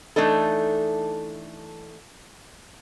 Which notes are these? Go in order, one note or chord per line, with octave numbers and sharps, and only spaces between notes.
E3 A3 D4 D#4 A4